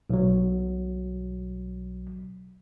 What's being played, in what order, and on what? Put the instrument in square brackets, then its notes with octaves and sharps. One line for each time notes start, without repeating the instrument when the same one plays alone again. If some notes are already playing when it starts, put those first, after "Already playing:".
[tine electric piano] B1 F#3